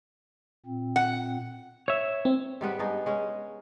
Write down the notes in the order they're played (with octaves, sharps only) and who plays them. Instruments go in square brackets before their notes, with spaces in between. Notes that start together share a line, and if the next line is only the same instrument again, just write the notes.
[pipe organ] A#2 C4
[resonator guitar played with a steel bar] F#5
[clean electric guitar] C#5 E5
[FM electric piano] C4
[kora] G#2 G3 B3 B4
G2 B3 D#4 G#4
G#3 C#4